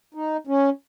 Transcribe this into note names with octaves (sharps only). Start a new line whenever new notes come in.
D#4
C#4